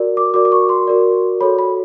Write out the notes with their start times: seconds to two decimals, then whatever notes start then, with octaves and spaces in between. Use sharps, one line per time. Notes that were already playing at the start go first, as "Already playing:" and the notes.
Already playing: F#4 A#4 D5
0.17 D6
0.34 F#4 A#4 D5 D6
0.45 D6
0.52 C#6
0.69 C6
0.87 F#4 A#4 D5
1.41 F#4 A4 C#5 B5
1.59 B5